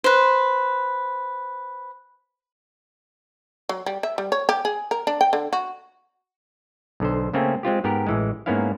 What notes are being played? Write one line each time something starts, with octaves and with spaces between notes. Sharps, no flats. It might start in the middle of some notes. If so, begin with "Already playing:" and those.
B4 C5
F#3
G3
E5
G3
C#5
G4
G#4
A#4
D4
G5
D3
F#4
B1 D3 C5
C#3 A3 A#3 C4 C#4
G#3 C4 F4 G4
G#2 B3 G4 A#4
A1 E3 G#3
G#2 A#3 B3 C#4 E4 F5